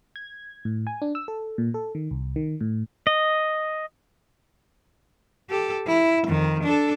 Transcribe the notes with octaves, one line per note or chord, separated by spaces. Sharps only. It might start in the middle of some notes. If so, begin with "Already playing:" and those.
G#6
A2
G#5
D4
E6
A4
A#2
A4
D#3
C2
D#3
A2
D#5
G4 A4
E4
F2 D#3
D4 A4